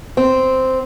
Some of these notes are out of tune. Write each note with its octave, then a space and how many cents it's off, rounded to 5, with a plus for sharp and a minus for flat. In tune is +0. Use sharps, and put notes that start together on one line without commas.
C4 -5